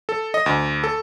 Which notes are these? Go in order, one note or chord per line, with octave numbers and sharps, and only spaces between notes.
A4
D#5
D2
A4